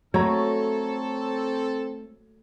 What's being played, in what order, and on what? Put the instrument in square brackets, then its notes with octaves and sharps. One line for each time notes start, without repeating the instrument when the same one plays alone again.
[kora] F#3 [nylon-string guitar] A3 [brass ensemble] C4 A4 [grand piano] C#5 A#5